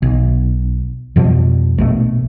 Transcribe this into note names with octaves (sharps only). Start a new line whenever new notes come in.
B1
F2 B2 F3 G3
A#1 B2 A3